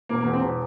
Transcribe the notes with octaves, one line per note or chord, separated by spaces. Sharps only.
E1 A#3
A#3
E2
C4
E1